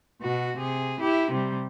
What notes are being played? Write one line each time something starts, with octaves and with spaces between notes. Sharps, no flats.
B2 F#4
C3 G#4
E4 G4
C3 G3